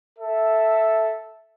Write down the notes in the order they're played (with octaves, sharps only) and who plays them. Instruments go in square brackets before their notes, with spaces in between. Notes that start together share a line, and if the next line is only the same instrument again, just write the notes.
[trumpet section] A4 E5